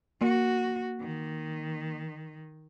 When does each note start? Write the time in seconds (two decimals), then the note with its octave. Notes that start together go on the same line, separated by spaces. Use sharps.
0.21 A#3 F#4
1.01 D#3